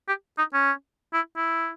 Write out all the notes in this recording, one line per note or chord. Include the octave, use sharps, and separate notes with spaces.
G4
D#4
C#4
E4
E4